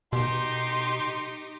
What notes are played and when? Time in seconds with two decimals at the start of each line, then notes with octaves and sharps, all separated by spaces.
0.13 B2 D#4 G4 C6